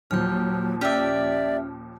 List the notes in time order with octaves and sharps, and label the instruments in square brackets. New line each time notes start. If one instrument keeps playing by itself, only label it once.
[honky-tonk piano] D#2 A#2 F3 [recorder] F#3 [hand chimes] F6 G6
[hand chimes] C#4 F6 [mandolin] G4 E5 [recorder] D5